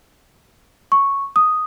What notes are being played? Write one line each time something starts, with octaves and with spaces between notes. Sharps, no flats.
C#6
D#6